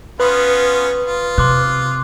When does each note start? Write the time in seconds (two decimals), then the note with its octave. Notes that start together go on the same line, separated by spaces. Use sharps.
0.20 B3 C#4 F4 B4 D#6 F#7
1.07 F4
1.38 C3 C6 D6 F#6